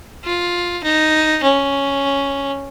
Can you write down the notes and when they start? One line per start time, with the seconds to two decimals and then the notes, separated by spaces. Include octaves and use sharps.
0.25 F4
0.84 D#4
1.43 C#4